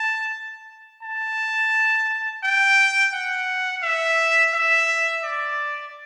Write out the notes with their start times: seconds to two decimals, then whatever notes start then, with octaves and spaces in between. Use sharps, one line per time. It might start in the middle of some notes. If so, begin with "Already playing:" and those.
Already playing: A5
1.03 A5
2.43 G5
3.13 F#5
3.83 E5
4.54 E5
5.23 D5